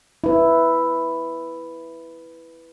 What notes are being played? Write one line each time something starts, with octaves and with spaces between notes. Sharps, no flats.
E4 B4